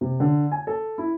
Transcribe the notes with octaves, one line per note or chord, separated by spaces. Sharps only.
C3
D3
G#5
A4
E4